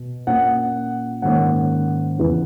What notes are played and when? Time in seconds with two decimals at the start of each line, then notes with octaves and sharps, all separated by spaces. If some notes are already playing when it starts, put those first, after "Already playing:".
Already playing: B2
0.27 A#2 A#3 C#4 F#5
1.22 G#2 D#3 A#3 C#4 F#5
2.18 E2 C#3 E3 B3